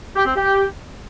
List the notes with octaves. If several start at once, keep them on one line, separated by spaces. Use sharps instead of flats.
G4
C4
G4